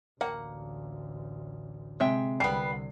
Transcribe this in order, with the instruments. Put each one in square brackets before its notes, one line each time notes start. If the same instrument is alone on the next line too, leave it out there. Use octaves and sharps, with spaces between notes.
[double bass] A1 D2 [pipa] A#3 [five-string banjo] F#5
[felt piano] C3 [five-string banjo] G#3 E5 G5
[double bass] C2 D3 [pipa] G3 B3 [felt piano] C7